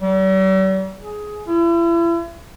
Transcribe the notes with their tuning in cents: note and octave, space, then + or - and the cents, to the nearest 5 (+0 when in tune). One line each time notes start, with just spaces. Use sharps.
G3 -45
G#4 +15
E4 +40